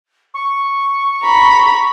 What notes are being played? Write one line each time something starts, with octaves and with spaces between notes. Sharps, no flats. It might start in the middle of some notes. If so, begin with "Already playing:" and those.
C#6
A#5 B5